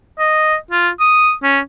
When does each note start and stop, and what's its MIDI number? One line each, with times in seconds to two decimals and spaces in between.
0.19 0.56 75
0.71 0.89 65
1.00 1.33 87
1.43 1.59 61